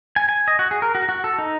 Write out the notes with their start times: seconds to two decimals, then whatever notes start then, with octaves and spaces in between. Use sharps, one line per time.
0.16 G#5
0.29 G#5
0.48 D#5
0.59 F#4
0.71 G#4
0.82 A#4
0.95 F#4
1.09 F#4
1.24 A4
1.39 D#4